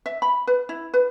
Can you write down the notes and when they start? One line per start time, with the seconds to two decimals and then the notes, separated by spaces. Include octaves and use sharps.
0.06 E5
0.22 B5
0.47 B4
0.69 E4
0.94 B4